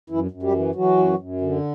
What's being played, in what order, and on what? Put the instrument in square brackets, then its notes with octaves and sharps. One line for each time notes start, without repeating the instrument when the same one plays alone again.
[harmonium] F#2 E3 E4
F#2
G3 G4
E3
E3 F#3 F#4
F#2
F#2
D3